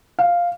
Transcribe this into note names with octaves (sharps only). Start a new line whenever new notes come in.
F5